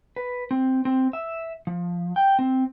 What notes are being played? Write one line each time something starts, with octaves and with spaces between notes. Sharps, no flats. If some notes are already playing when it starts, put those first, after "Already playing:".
B4
C4
C4
E5
F3
G5
C4